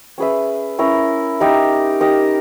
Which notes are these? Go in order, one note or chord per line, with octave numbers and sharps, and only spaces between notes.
C#4 G#4 B4 E5
C#4 E4 A#4
D#4 G4 A#4 E5
D#4 G4 A#4 D#5